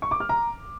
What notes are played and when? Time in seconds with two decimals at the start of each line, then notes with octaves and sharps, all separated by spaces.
0.02 C#6
0.11 D6
0.20 F6
0.29 A#5